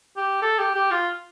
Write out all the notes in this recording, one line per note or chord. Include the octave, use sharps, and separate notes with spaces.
G4
A4
G4
G4
F4